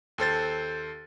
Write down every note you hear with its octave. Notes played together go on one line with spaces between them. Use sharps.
D#2 A4 C5 A6